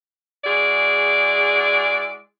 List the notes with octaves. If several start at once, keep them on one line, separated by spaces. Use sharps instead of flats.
G#3 E4 F#4 G#4 D5